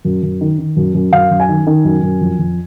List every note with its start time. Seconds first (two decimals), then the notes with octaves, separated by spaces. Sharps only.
0.05 F#2
0.23 F#2
0.41 D#3
0.59 D#3
0.76 F#2
0.94 F#2
1.13 F#2 F5
1.31 F#2
1.40 G#5
1.49 D#3
1.67 D#3
1.85 F#2
2.03 F#2
2.21 F2
2.39 F2